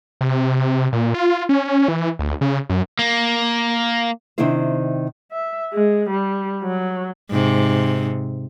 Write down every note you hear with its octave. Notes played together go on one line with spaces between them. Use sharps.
C3
A#2
F4
C#4
E3
D2
C#3
F#2
A#3
C3 D#3 C4 D4 E4 C5
E5
G#3
G3
F#3
G#2 C3